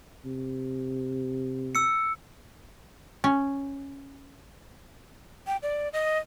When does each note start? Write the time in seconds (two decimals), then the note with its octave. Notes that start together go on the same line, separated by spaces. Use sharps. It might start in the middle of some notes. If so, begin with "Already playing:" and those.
0.25 C3
1.75 E6 C#7
3.24 C#4
5.47 G5
5.63 D5
5.93 D#5